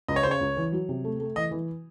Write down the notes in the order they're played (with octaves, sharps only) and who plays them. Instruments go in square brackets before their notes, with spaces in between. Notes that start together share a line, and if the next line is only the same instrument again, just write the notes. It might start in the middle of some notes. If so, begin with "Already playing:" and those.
[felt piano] C#2 [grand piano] D#5
[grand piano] C#5
[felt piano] C#3 [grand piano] C5
[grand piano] C#5
[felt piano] C#2
E3
F#3
C3
A3
A3
[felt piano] E3 [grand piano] D#5
[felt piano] E3